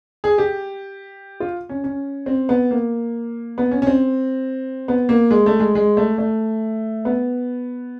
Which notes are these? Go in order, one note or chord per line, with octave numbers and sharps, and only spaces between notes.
G#4
G4
F4
C#4
C#4
C4
B3
A#3
B3
C#4
C#4
C4
B3
A#3
G#3
A3
G#3
G#3
A3
A3
B3